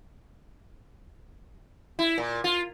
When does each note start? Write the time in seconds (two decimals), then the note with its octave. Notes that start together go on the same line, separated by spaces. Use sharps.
1.99 E4
2.18 A#2
2.44 F4